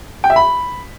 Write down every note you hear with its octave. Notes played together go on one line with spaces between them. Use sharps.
G5
E5
B5